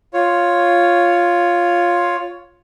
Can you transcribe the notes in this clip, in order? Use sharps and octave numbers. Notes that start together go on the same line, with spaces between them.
F4 C#5